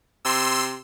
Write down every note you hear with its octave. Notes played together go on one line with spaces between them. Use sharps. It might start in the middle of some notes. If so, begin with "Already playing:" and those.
C3 C6 E6